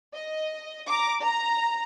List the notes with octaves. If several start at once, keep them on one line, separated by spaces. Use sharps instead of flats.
D#5
A#5 D6
A#5